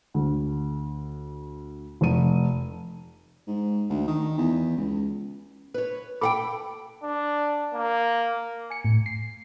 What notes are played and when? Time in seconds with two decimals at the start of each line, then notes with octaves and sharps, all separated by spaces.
0.14 D2
2.01 F1 D#7
3.47 G#2
3.90 D2
4.08 D#3
4.38 E2
4.77 C#2
5.74 B4 C#5
6.21 A4 F#5 G5 B5 D6
7.03 D4
7.74 A#3
8.70 G#5 C#7
8.85 A2
9.06 C7